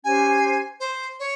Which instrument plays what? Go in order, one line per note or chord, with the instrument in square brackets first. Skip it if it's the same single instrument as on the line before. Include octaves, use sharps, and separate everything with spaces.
[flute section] C#4 G4 C5 [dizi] G#5
[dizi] C5
C#5